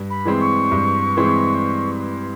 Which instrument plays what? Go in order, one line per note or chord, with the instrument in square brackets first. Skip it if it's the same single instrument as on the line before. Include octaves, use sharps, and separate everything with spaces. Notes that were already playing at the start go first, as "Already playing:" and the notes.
Already playing: [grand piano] G2
[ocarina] B5
[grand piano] E3 G#3 C4
[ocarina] C#6
[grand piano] G2
E3 G#3 C4